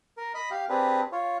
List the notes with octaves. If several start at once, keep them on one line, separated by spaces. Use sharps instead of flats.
A#4
D#5 B5
G4 F5
C4 D4 G4 G#4 B4
F4 C#5